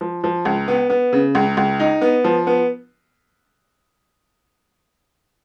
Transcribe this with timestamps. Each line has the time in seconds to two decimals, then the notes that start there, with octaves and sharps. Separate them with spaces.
0.01 F3
0.24 F3
0.45 C#2
0.68 B3
0.90 B3
1.13 C#3
1.35 C#2
1.57 C#2
1.80 D#4
2.01 B3
2.24 F3
2.47 B3